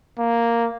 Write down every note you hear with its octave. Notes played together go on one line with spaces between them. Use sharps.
A#3